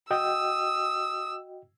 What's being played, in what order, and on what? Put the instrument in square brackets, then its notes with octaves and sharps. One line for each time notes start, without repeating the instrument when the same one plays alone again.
[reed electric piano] F#4 D#5 G5 [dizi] D#6 [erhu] E6